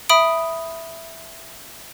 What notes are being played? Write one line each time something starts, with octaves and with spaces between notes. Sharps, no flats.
E5 B5 D#6 D7